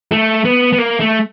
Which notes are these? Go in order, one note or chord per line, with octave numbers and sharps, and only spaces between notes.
A3
B3
B3
A#3
A3